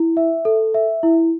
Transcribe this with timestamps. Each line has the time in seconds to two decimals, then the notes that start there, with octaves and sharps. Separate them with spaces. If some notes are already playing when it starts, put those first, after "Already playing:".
Already playing: E4
0.17 E5
0.45 A4
0.74 E5
1.03 E4